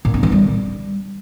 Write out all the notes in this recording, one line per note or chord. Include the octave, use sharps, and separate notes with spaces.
A#2
D4
E3
G3